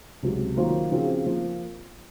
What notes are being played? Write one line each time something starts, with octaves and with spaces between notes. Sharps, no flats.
C#2 C3 F#3
D#3 F#3 A#3 F4 C5
C#3 F3 C4 F#4
F3 A#3